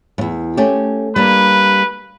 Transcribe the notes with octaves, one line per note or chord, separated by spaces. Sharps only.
E2 G2
A3 C#4 G4
G3 A#3 D4 B4